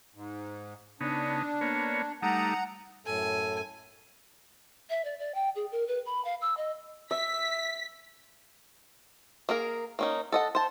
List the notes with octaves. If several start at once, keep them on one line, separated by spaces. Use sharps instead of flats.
G#2
C#3 B3 D4 D#4
A#3 B3 C#5
G3 A3 D#4 F#5 A#5
F#2 A2 A4 G#5
E5
D5
D5
G5
G#4
A#4
B4
B5
F5
E6
D#5
E5 B6
A#3 G#4 A#4
A#3 C#4 D#4
A4 D#5 F#5
C5 A5